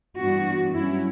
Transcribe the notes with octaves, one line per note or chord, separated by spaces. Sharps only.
G2 E3 B3 D4 F#4
G2 F#3 C#4 E4